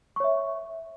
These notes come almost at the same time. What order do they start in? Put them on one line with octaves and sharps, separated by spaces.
C#6 C#5 E5